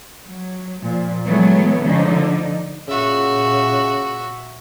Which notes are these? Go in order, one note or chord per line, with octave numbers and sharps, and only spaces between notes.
F#3
A#2 F3
E3 F#3 G#3 A3 B3
D3 F3 D#4
A#2 C#3 F#4 E5